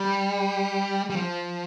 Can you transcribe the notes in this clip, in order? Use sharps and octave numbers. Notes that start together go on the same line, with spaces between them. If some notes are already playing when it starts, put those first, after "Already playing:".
Already playing: G3
G3
F3